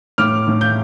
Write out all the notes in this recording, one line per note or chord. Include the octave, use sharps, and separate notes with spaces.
A2 D6 F6
A2
G6